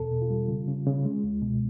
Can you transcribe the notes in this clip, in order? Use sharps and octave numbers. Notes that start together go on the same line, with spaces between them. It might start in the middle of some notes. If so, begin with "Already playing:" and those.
Already playing: E2 B2 A4
B2
F4
G3
C#3
C#3
C#3
G#3
C#2
B2